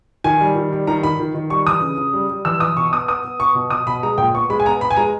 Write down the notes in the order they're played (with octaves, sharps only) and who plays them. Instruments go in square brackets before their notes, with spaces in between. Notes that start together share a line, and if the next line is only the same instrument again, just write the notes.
[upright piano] D#3 G#5
G3
D#3
G3
D#3 A#5
D#3 B5
D#3
D#3
G3 C#6
E3 D#6
C#3
C#3
G3
G3
E3 E6
E3 D#6
B2 C#6
B3 D#6
B3 D#6
B3
B3 C#6
B2
B2 D#6
B2 B5
G#3 A#5
A#2 G5
B3 C#6
G#3 B5
G#5
B3 A#5
B3 B5
G#5
G#3 A#5